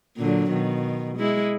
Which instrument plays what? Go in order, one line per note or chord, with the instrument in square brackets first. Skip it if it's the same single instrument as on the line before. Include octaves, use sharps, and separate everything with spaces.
[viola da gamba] A#2 D3 F#3
B2 D#3
G#3 E4